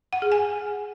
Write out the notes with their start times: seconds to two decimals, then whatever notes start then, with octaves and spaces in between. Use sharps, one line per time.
0.13 F#5
0.22 G#4
0.32 G#5